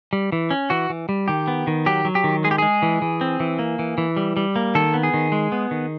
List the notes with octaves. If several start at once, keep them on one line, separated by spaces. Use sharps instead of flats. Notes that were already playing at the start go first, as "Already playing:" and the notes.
G3
E3
C#4
E3 F#4
E3
G3
D#3 G4
B3
D#3
F#3 G4
F#3
G4
D#3
G#3 G#4
G4
G#3 G#4
E3
E3
C4
E3
A#3
E3
E3
G3
G3
A#3
D#3 A4
B3
G#4
D#3
G#3
B3
D#3